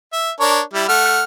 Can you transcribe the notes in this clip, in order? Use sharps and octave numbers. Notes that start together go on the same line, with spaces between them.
E5
D4 A#4 C#5
G3 E4
A3 F#5 F6